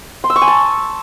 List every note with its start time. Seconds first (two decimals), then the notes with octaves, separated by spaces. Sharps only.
0.24 C6
0.30 E6
0.36 C#6
0.42 G#5
0.48 A5